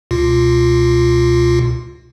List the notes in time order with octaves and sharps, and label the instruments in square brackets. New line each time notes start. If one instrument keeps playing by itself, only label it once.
[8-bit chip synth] C#2 B2 F4